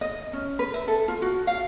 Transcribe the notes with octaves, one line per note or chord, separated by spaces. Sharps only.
D#5
C#4
B4
E5
A4
F4
F#4
F5